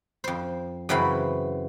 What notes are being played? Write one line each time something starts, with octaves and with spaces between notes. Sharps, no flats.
F2 C5
F#2 C#3 E3 C4 F5 B5